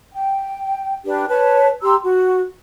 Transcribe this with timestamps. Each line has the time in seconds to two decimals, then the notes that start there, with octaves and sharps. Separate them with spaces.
0.13 G5
1.05 D4 G4 B4
1.29 B4 C#5 A5
1.82 G4 A#5 C6 E6
2.03 F#4